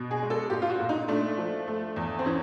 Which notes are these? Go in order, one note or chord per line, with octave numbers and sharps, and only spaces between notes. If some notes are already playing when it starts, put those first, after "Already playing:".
Already playing: B2
G#4
G#3
A4
A#2 G4
F4
F#4
A#2
D#4
A3 D4
F3
A3
E2
C4
E3 C#4